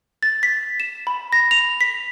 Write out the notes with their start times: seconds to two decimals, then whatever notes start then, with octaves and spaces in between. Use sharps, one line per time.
0.23 A6
0.43 B6
0.80 E7
1.07 B5
1.32 A#6
1.51 F7
1.81 B6